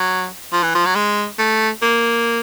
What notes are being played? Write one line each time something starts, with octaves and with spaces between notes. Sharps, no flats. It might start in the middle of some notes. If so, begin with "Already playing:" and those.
Already playing: F#3
F3
E3
F3
F#3
G#3
A3
A#3